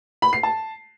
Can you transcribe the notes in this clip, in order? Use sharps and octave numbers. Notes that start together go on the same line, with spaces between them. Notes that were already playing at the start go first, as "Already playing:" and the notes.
B5
C7
A5